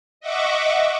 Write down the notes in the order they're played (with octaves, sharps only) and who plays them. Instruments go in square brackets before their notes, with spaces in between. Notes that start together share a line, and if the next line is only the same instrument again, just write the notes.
[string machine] D#5 E5 F#5 C#6 D6